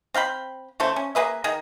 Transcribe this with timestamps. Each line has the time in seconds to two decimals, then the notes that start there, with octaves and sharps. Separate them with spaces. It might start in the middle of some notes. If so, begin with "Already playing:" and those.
0.14 C4 F5 G5 B5
0.80 C#3 A3 A4 C5
0.96 C#4
1.15 A#3 G#4 B4 E5
1.44 D#3 G#4 D#5